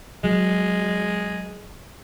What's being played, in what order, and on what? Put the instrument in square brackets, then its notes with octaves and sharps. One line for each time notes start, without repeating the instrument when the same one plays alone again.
[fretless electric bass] F#3 [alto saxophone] G#3